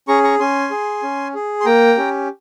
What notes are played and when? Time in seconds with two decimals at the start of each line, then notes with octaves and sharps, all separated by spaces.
0.08 C#4 G#4 A#5 C#6
0.24 A#5 C#6
0.40 C#4 G#5 C6
0.71 G#4
1.03 C#4
1.34 G#4
1.61 C6
1.65 A#3 G5 A#5
1.97 C#4 G4